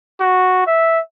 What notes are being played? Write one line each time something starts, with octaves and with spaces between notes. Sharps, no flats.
F#4
E5